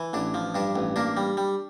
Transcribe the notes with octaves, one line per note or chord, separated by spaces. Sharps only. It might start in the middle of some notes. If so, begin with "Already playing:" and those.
Already playing: E3
A1 D4
F3
G2 D4
A1
A#3 D4
G3
G3